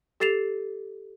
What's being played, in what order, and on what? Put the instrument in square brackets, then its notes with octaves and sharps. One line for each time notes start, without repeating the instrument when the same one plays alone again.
[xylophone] G4 A4 A6 C7 E7 F7